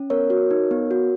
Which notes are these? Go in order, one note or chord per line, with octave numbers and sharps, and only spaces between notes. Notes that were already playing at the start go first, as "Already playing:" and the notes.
Already playing: C#4
B3 A#4 C#5
F#4
D#4
B3
F#4